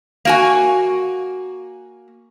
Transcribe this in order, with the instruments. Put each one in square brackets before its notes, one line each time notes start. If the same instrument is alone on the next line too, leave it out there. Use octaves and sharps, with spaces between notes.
[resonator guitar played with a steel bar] A#3 F#4 G#5